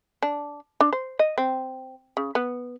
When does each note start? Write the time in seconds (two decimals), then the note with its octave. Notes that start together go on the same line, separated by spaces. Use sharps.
0.22 D4
0.80 D4
0.93 C5
1.19 D#5
1.38 C4
2.17 C#3
2.35 B3